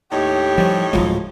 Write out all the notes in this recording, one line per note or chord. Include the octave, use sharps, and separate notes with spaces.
D#2 A2 D#4 G4 C#5
F3 G3 C4 C#4
D1 A#1 F3 F#3 G#3 F4